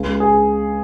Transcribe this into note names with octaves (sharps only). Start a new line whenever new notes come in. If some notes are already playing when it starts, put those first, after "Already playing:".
Already playing: C#2
G#4